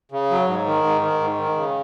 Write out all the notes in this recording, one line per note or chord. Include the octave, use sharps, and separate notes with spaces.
C#3
F#3
G#2
D#3
G#2
D#3
G#2
D#3
C#3